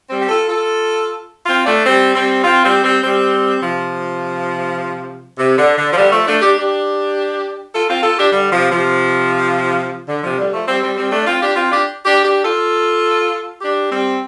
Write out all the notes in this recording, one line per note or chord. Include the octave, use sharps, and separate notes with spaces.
G3 C4
G4
F4 A4
F4 A4
C4 F4
A3 D4
G3 C4
G3 C4
C4 F4
G3 C4
G3 C4
G3 C4
C3 F3
C3
D3
D3
F3
D3 G3
F3 A3
A3 D4
D4 G4
D4 G4
F4 A4
C4 F4
F4 A4
D4 G4
D3 G3
C3 F3
C3 F3
D3
C3 F3
D3 G3
F3 A3
G3 C4
G3 C4
G3 C4
A3 D4
C4 F4
D4 G4
C4 F4
D4 G4
D4 G4
D4 G4
F4 A4
D4 G4
G3 C4